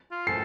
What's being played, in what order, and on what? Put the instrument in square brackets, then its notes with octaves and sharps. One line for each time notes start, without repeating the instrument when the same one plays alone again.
[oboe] F4
[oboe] A4 [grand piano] C7